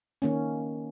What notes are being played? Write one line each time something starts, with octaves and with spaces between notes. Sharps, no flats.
D#3 A#3 C#4